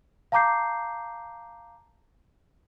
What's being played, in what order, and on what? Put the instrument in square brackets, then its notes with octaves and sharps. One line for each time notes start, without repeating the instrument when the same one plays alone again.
[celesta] F5 A5 A#5 D6 G6 C7